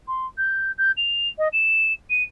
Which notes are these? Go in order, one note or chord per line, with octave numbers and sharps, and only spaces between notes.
C6
G6
G6
F7
D#5
E7
D#7